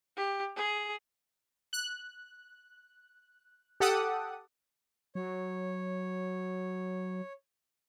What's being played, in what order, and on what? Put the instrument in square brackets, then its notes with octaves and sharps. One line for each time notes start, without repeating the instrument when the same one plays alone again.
[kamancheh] G4
G#4
[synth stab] F#6
G4 A4 F#5 D6 D#6
[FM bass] F#3 [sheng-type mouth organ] C#5